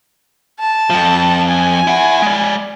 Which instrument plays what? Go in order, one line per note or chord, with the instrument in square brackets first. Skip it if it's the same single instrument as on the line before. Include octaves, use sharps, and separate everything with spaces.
[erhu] A5
[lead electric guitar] F2 F3
[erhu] G#5
[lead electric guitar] E4 F#5
G#3 D5